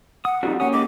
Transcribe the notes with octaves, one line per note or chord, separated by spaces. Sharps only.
F#5 D#6
F2 F3 G3 D#4 F#4
A#3 C#4 G4 F#5 D#6
C#3 G#3 D6